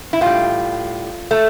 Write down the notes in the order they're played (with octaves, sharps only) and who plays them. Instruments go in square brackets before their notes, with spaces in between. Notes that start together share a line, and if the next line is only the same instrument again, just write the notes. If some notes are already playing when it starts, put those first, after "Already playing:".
[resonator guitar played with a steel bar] E4
A2 G3 F4
A3